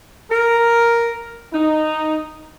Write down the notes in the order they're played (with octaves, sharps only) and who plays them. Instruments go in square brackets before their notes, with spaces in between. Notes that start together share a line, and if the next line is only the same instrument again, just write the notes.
[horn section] A#4
D#4